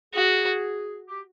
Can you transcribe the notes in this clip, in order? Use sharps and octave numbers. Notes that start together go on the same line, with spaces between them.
F#4 G#4
G4